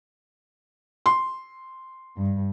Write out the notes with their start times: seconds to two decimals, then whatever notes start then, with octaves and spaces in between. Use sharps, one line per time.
1.06 C6
2.18 G2